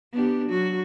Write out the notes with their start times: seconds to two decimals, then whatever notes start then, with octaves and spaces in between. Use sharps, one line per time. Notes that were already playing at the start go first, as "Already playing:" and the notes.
0.12 B3 D4 G4
0.49 F#3 F#4